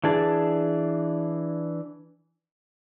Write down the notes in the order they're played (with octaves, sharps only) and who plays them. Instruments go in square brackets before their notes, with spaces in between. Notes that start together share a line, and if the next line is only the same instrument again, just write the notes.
[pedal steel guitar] E3 D4 G#4 A5